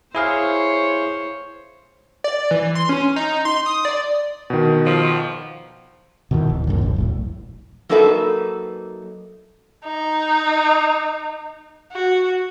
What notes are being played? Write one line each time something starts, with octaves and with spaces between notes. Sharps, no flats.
E4 G#4 C5 C#5 F5
D5
E3
C6
C#4
D#4
C6
D#6
D5
B2 D#3
F3
B2 D#3 E3
D1
G#1 C#2 F#2 A#2
E1 A#1
E1 B1 A2
F#3 A#3 D#4 A4 B4 E5
D#4
F#4